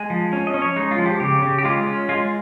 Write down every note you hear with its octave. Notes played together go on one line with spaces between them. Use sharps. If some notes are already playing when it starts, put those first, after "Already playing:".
Already playing: G#3 G#5
F3
C#4
D#5
C#4
C#5
G#3 D#4
F4
F3
G4
C#3 G4
C#3
G4
G#3 F4
C#4
G#3 F4